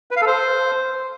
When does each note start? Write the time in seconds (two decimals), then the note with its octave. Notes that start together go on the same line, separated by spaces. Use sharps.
0.11 B4
0.16 F5
0.22 A4
0.27 C5